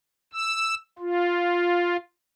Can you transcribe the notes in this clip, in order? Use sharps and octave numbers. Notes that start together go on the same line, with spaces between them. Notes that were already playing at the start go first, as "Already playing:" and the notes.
E6
F4